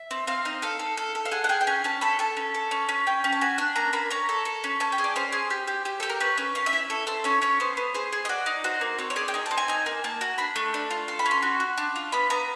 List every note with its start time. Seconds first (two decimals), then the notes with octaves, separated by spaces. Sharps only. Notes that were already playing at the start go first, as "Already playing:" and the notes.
Already playing: E5
0.11 C4
0.27 C4 F5
0.45 D#4
0.62 A4 F5
0.79 A4
0.97 A4
1.15 A4
1.25 F5
1.31 G#4 F#5
1.44 F#5
1.49 G#4 G5
1.61 G5
1.67 C#4 G#5
1.84 C#4 A5
2.01 A4 B5
2.19 A4 A5
2.37 C#4
2.54 A4
2.71 C#4
2.89 C#4
3.07 C#4 G5
3.24 C#4
3.32 A5
3.41 F#4 G#5
3.58 D4
3.76 A#3 A#5
3.93 A#3 B5
4.10 C#4 A#5
4.29 A4
4.45 A4
4.64 C#4
4.80 C#4 A5
4.92 G5
4.98 G#4
5.04 D5
5.16 C#4 C5
5.32 G#4
5.50 G4
5.67 G4
5.85 G4
6.00 G4 A4
6.09 A#4
6.20 C#4 B4
6.37 C#4
6.55 C#4 F5
6.66 E5
6.73 E4
6.90 A4
7.07 A4 C5
7.24 C#4 C#5
7.42 C#4 C#5
7.60 B3 C5
7.77 B3
7.94 G#4 C5
8.12 G#4
8.25 D#5
8.29 F#4 D5
8.46 D#4
8.64 F#4 C5
8.81 A#3
8.99 C4 C#5
9.10 C#5
9.16 G#4 D5
9.28 G5
9.34 D#4 G#5
9.46 C4 A5
9.57 G#5
9.68 D#4 G#5
9.86 A#3
10.04 A#3 A5
10.21 F#4
10.38 D4 B5
10.56 A3
10.74 D4
10.91 F4
11.08 A4 C6
11.19 B5
11.26 C#4
11.31 C6
11.42 F#4
11.60 F#4
11.77 D4
11.96 F4
12.12 B3 B5
12.30 B3 A#5